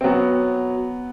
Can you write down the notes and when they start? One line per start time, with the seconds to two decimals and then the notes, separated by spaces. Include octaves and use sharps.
0.01 C4
0.04 F#3 B3